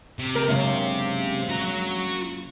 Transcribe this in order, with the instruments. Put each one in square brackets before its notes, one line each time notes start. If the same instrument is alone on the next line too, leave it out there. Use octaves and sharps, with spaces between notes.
[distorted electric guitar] C3
[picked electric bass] C#3 [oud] A#4
[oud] F#2 C#3 [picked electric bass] G#3 A#3 D4
[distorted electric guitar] F#4 A#5